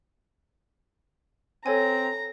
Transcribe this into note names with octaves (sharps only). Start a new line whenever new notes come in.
C4 A4 C#5 G#5 A#5